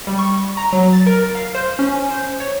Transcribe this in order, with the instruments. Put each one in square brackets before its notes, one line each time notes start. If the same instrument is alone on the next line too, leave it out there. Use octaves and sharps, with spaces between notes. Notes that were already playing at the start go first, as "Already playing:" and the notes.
[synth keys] G3
C#6
A#5
F#3
A6
A#4
F5
C5
C#4
C5
C#5